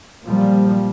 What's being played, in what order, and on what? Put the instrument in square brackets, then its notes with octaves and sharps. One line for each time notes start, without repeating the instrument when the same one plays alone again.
[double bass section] A#2 F3 G3